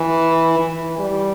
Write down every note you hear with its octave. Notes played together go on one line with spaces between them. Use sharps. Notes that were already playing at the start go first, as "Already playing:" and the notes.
Already playing: E3
E3
G3